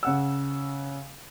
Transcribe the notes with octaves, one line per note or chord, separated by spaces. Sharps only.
C#3 F#5 E6